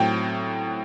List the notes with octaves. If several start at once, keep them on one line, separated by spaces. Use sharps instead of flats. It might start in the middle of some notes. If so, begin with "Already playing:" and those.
Already playing: A2 F#3 C4 G5